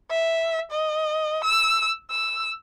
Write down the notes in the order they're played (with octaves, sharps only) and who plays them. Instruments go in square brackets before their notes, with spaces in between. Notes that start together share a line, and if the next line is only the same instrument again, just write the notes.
[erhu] E5
D#5
E6
E6